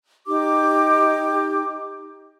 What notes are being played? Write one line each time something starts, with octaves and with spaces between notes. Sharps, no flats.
D#4 G4 D6